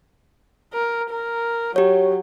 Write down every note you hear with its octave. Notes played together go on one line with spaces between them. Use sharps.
A#4
A#4
F#3 G4 C#5